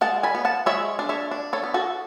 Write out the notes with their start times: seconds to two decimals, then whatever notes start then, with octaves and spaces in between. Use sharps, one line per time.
0.01 G#3 F#5 A5
0.23 G#5 B5
0.35 B3
0.45 F#5 A5
0.66 G#3 C#5 E5
0.99 D4
1.09 C#5 E5
1.31 D4
1.53 A4 C#5
1.63 B3
1.74 F#4 A4